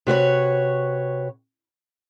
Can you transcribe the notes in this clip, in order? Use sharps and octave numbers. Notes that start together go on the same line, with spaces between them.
C3 F#4 B4 C#5